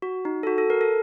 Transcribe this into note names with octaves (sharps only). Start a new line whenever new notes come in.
F#4
D#4
A4
F#4
A4
A#4
A4